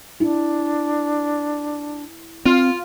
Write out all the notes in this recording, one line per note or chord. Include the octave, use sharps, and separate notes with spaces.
D4 E4
C4 F4